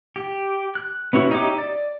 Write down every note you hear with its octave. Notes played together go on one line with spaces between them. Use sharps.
G4
F#6
B3 C#4 E4 F#4
D#4 G4 C#5 E5 D6
D5